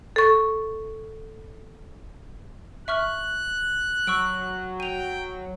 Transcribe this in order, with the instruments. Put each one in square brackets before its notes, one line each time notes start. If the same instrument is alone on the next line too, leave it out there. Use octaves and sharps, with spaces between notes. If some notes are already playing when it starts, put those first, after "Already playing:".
[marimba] A4 C#6
[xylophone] E5 C#6 F6 [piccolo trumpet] F#6
[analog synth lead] F#3 [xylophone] C#6 E6 D7
[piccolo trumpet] G5 [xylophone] D#7 F7